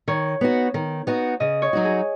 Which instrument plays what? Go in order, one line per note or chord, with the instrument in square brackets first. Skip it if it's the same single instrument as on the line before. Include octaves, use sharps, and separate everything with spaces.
[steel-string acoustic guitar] D#3 [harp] C#5
[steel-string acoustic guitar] B3 D#4 F#4
D#3
B3 D#4 F#4
[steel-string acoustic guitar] C#3 [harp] D#5
[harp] C#5
[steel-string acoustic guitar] F#3 D#4 F#4
[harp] G#4